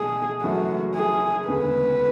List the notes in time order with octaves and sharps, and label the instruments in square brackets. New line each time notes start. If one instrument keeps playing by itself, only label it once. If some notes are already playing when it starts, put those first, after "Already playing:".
Already playing: [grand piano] C#2 B2 A3 [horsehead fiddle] G#4
[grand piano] F#1 F#2 E3 A3 [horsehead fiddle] F#4
[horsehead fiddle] G#4
[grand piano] E1 D2 C#3 [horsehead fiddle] B4